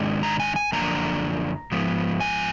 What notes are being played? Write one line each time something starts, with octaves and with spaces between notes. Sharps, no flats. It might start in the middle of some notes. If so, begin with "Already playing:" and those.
Already playing: G#2 D#3 G#3 D4
A#5
G#5
G#5
F#2 D3 F3 A#3 D4 A#5
G#2 F3 B3
G#5